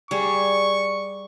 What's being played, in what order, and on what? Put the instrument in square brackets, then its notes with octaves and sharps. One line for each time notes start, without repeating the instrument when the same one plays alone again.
[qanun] G3 G#4 [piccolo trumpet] C#6